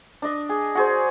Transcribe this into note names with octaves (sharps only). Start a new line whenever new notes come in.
D4 D#5
G#4
F#4 G#4 C5